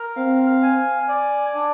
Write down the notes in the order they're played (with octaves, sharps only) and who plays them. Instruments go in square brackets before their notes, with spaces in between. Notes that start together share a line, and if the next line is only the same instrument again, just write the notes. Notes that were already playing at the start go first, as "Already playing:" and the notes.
Already playing: [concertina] A#4
[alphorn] C4 [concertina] F5
[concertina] G#5
D5
D4